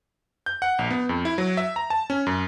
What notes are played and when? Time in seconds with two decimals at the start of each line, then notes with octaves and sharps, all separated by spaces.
0.46 G6
0.62 F#5
0.79 A#1
0.91 B3
1.09 F2
1.25 E4
1.38 F#3
1.57 E5
1.76 A#5
1.90 A5
2.10 C#4
2.27 F#2